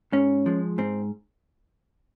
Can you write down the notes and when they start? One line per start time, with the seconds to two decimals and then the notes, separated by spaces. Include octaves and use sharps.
0.12 G#2 C#4
0.46 F3 G#3
0.78 G#2 C4